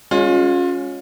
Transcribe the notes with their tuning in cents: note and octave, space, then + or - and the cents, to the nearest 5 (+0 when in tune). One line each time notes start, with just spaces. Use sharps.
G#3 +0 C#4 +0 F4 +30